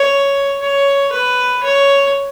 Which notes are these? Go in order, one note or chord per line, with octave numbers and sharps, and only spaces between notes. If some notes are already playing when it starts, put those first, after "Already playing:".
Already playing: C#5
C#5
B4
C#5